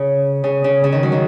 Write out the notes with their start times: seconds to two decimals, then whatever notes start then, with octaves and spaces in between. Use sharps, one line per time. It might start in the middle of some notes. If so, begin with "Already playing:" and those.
Already playing: C#3
0.44 C#3
0.64 C#3
0.84 C#3
0.92 D#3
1.03 F#3
1.12 D#3